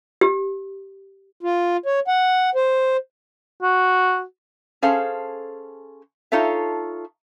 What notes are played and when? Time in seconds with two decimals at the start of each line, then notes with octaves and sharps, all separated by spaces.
0.21 G4
1.43 F4
1.86 C#5
2.08 F#5
2.55 C5
3.62 F#4
4.82 C#4 G#4 A4 C5 F5
6.32 D#4 F4 A4 C#5 E5